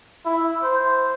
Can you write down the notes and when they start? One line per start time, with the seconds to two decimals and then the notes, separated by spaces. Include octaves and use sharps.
0.24 E4
0.62 C5